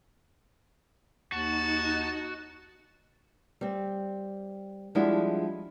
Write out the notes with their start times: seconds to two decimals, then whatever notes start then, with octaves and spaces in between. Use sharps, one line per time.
1.32 D#2 D#4 F#4 A5
3.61 G3 C4
4.95 F3 G3 G#3 D4 E4 F#4